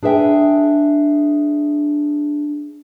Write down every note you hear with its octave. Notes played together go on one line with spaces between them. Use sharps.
D4 G#4 B4 E5 G5 G#5